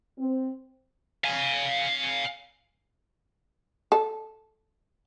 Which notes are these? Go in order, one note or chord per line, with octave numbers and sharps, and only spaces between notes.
C4
F5 G#5
A4